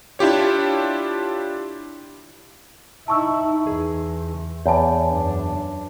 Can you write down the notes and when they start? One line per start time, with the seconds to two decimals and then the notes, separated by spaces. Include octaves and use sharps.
0.19 D4 E4 F4 G4 C#5
3.08 D#4 E4 A5 C#6 E6
3.67 E2 G#4
4.66 E2 C#5 A5
5.11 F#2 D4